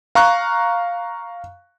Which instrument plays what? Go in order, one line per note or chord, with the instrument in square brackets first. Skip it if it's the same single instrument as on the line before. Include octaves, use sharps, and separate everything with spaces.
[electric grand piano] F5 A#5 C#6 F6 F#6